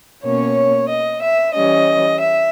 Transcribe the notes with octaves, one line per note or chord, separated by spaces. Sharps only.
B2 A#3 C#4 C#5
D#5
E5
E3 G3 C#4 D#5
E5